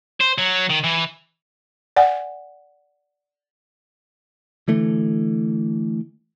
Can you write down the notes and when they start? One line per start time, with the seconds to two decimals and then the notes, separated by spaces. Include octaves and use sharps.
0.21 C5
0.38 F#3
0.70 D#3
0.84 E3
1.96 D5 F#5 G#5
4.68 D3 E3 A3